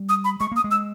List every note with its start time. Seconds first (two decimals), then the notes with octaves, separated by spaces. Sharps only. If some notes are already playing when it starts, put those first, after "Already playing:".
Already playing: G3
0.09 D#6
0.24 B5
0.40 G#3 C#6
0.52 A#3 D#6
0.64 G#3
0.71 E6